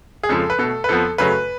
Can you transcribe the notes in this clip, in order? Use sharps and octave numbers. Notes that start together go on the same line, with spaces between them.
G#4
F2 C#3 F3 G#3 A4
B4
B2 A3 A4
B4
F2 F3 B3 A4
F#2 C#3 F#3 A3 B4